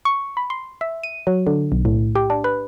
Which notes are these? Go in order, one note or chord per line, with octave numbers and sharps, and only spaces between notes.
C#6
B5
C6
E5
D#7
F#3
D3
B1
A2
G4
D4
B4